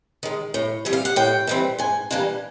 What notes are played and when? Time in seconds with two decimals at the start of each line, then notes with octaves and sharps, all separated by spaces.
0.23 D#3 G#3
0.54 A2
0.85 E3 G3 C4
0.93 F5
1.05 F#5
1.16 A2 G5
1.47 E3 G3 C4
1.79 G#2 G#5
2.11 E3 G3 A#3 D4